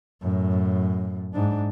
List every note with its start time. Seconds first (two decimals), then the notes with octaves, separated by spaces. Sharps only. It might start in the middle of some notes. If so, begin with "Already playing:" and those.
0.22 F#2 A2
1.33 G#2 D4